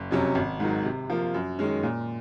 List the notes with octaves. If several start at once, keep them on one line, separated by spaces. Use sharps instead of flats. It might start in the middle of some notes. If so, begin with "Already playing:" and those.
Already playing: F#1
F2 C3 F#3 C#4
G#1
G#2 D#3 F#3
C3
F3 A#3 F4
F#2
D#3 G#3 C#4
A#2